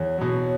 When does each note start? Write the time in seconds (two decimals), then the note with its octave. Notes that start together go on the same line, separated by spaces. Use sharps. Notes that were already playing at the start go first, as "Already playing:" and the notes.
Already playing: E2 C#5
0.18 B2 F#3